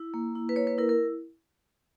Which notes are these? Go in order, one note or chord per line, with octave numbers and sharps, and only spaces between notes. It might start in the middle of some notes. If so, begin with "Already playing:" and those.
Already playing: E4
A#3
E4
B4
A#3 C#5
B4
E4 A#4
A#4